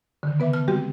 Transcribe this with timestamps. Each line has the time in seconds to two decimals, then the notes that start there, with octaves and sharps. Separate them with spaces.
0.23 D3 D#3
0.39 C#3 B3 B4 E5 D6
0.53 B4 A5 F6
0.68 G3 G#3 C4 F#4 G4